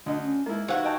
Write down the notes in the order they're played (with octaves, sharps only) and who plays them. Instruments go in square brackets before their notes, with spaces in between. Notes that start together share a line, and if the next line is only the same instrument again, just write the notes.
[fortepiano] D2 D#5 [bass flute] D4
[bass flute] C#4
[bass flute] G#3 [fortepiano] A#3 E4 [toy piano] D#4
[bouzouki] E3 F#4 [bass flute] D#4 [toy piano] G4 C5 F5
[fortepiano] D#5 G5 A5